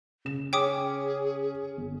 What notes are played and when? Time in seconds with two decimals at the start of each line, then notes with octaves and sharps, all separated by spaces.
0.25 C#3 E7
0.53 C#4 G#4 G5 D6 D#6
1.77 G1